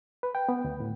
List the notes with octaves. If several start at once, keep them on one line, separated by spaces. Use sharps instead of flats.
B4
G5
B3
D2
A2